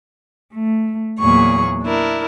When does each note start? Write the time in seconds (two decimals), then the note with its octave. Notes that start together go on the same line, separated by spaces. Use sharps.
0.52 A3
1.20 E2 A#2 F#3 A#3 G#4 C#6
1.84 D4 E4 A#4